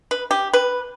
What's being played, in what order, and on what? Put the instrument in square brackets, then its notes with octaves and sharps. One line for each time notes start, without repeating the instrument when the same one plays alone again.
[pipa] B4
G4
B4